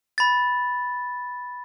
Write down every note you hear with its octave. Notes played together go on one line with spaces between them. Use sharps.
B5 A6